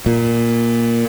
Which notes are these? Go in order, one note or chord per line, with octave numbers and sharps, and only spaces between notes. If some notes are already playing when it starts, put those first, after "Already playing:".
A#2